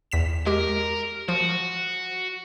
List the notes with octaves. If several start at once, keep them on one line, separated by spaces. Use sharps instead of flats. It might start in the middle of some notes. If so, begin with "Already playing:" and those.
E2 B6 E7
G#3 G4 A#4
F3 F#4